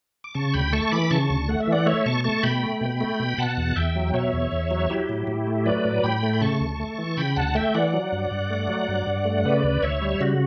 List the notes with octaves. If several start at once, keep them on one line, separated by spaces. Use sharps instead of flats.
D6
C#3 A5 C#6
D2 G5 B5
A3 A5 C#6
E3 B5 D6
C#3 A5 C#6
D2
A3 F#5
E5
E3 D5 F#5
A3 C#5 E5
B2 A5 C#6
A3 A5 C#6
B2 G5 B5
A3
B2
A3
B2
B2 F#5 A5
E2
E2 E5 G5
F#3
B2 C#5 E5
E2
E2
F#3
F#3 E4 G4
A2
A2
A3
F#3 B4 D5
A2
A2 G5 B5
A3
B5
C#3 A5 C#6
D2
A3
E3
C#3 G5 B5
D2 F#5 A5
A3 E5 G5
E3 D5 F#5
F#3
G2
G2
A3
F#3
G2
G2
A3
C#3 B4 D5
D2
D2 C#5 E5
G3
C#3 F#4